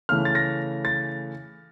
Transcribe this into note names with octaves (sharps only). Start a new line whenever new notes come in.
C#3 E3 A3 F6
A6
A#6
A6